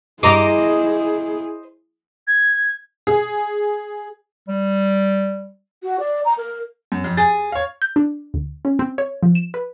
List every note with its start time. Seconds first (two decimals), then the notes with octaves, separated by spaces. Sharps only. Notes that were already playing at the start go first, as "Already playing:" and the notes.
0.23 G2 E4 G#4 C5 D#5 A#5 D6
2.27 G#6
3.07 G#4
4.48 G3
5.83 F#4
6.00 D5
6.25 A#5
6.38 A#4
6.92 F#2
7.04 F2
7.17 G#4 A6
7.52 C#5 F5
7.82 G6
7.96 D4
8.34 D2
8.65 C#4
8.79 C4
8.98 C#5
9.23 F3
9.35 E7
9.54 B4